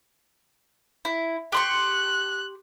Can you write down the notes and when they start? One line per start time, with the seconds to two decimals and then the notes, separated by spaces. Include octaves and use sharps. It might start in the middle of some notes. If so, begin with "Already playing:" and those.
1.05 E4
1.52 G4 C6 C#6 F#6